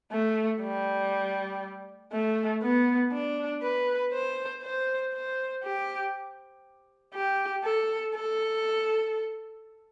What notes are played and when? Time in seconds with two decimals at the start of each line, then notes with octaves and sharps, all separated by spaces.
0.12 A3
0.62 G3
2.12 A3
2.63 B3
3.13 D4
3.63 B4
4.13 C5
4.63 C5
5.13 C5
5.64 G4
7.14 G4
7.64 A4
8.15 A4